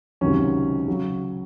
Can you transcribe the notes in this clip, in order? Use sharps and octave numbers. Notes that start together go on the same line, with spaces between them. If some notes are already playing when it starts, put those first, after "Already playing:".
C#2 C3 D#3 F#3 C#4
C#3 F#3